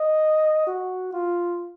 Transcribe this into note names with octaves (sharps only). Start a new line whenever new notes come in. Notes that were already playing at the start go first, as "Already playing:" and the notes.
Already playing: D#5
F#4
F4